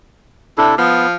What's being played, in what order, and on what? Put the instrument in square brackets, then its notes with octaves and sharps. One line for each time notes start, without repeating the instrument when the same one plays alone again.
[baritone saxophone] C3 [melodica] D4 E4 A4
[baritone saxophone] F3 [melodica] B3